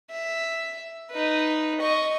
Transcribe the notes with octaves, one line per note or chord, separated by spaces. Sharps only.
E5
D#4 B4
D#5 C#6